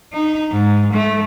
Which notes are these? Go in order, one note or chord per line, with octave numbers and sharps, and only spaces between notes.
D#4
G#2
A3